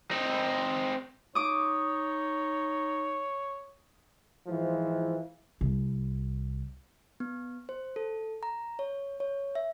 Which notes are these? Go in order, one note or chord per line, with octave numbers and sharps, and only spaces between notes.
C4 D#4
D#4 C#5 D6 D#6
G#2 E3 F3
C2
B3
C5
A4
A#5
C#5
C#5
E5